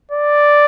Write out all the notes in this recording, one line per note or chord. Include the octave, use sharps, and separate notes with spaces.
D5